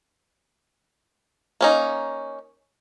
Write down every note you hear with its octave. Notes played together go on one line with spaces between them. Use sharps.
A#3 C#4 D#4